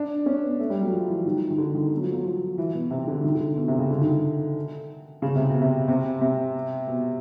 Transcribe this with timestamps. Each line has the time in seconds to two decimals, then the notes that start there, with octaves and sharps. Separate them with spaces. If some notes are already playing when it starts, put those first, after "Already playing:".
Already playing: D4
0.26 C#4
0.43 B3
0.59 A3
0.70 G3
0.81 F#3
0.92 F3
1.08 E3
1.26 D#3
1.51 D#3
1.58 D3
1.75 D#3
1.97 F#3
2.03 F3
2.13 F#3
2.24 F3
2.58 E3
2.75 B2
2.90 C3
3.07 D3
3.24 D#3
3.35 D3
3.57 B2
3.68 C3
3.79 C#3
3.90 D3
4.01 D#3
5.22 C#3
5.35 C3
5.49 B2
5.62 C3
5.88 C3
6.21 C3
6.88 B2